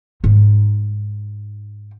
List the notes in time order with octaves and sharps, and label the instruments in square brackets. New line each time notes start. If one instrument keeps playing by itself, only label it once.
[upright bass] G#2 D#4